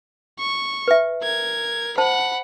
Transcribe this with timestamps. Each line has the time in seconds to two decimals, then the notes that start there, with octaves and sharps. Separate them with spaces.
0.39 C#6
0.88 B4 E5
1.23 A#4 G#6
1.98 C5 F#5 A5 B5